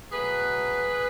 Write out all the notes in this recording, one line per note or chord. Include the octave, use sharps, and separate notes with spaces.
B2 F#3 A3 G#4 B4